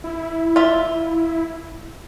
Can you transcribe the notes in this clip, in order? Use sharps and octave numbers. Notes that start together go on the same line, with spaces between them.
E4
F4 E5